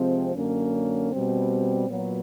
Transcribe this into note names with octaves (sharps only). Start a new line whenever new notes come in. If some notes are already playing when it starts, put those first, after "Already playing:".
Already playing: C3 F3 G#3 C4
F#2 D3 F#3 A#3 C#4
B2 G3 C4
A#2 F#3 B3